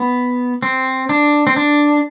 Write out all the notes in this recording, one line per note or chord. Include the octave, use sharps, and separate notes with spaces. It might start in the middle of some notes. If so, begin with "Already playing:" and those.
Already playing: B3
C4
D4
C4
D4